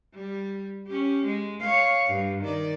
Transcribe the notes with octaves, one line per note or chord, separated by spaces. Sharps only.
G3
C#4 G4
G#3
C#5 F5
G2
D#3 D5